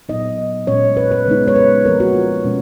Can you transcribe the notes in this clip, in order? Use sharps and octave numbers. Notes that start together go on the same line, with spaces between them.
A#2 F#3 B3 D#4 D#5
A#2 G#3 C#4 C#5
B4
B4
C#3 G#3 B3 D#4
C#5
B4
F3 A#3 D#4 A#4
F#4
F4
B2 G#3 C#4